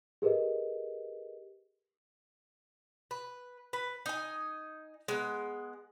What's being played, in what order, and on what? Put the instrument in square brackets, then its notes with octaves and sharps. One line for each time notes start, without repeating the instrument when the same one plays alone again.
[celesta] G4 G#4 A#4 B4 D#5
[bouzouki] B4
B4
D#4 G#5
G#3 B3